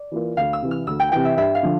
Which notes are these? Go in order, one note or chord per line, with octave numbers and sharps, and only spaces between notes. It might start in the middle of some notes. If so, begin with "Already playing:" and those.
Already playing: D5
E3 A#3 F4
D2 F5
E6
C3 E3
F6
D2 E6
G5
C3 E3 G5
E5
G2 E5
F5
D3 F3